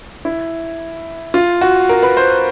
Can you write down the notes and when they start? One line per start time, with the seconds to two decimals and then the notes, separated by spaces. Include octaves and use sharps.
0.25 E4
1.34 F4
1.61 F#4
1.89 A#4
2.03 B4
2.17 C5